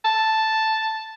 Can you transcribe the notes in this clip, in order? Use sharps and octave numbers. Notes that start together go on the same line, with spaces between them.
A5